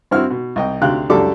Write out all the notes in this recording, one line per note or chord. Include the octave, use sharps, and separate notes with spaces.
G2 C4 E4 F#4 F6
B2
C2 D#5 G5
D2 C3 F5 G5 F#6
C#2 F#2 G3 D4 A4 D6